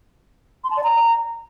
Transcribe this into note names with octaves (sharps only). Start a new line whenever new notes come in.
C6
A5
D5
A#5